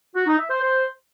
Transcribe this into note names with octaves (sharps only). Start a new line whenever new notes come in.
F#4
D#4
E5
C5
C5